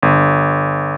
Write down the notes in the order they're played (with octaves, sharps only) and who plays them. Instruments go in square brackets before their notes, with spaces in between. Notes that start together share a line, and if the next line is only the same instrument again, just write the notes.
[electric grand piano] G1